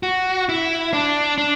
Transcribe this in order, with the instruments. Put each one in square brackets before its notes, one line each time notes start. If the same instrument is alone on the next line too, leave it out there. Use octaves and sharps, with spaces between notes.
[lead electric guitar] F#4
E4
D4
D4